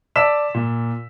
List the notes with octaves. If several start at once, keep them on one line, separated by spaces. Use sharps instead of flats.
D5 A5 E6 B6 E7
A#2